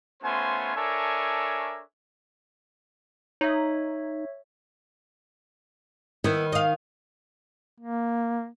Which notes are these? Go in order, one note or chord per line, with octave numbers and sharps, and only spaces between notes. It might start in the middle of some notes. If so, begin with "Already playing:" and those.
A3 B3 C#4 F4 C5 G#5
D4 A4 A#4 C#5 E5 G#5
D#4 C#5 E5
D#3 B3 E4
D#5 F5
A#3